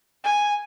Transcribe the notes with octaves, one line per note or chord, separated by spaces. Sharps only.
G#5